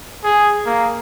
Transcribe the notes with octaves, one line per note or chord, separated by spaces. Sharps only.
G#4
A#3